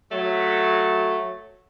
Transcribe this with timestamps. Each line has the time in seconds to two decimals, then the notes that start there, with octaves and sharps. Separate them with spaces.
0.11 F#3 A3